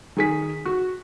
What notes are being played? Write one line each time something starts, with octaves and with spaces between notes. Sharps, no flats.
D#3 G#4 B6
F#4